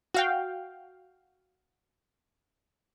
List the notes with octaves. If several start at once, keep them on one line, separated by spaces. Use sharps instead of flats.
F#4 F5 G5